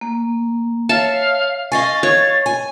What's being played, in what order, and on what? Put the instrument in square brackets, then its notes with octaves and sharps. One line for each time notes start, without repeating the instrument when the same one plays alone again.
[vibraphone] A#3
[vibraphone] C#5 [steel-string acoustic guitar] E5 [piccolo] F5 [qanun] A5
[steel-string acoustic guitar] D#5 F5 G#5 [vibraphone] C#6 [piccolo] A6
[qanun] C#5
[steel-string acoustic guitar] G#5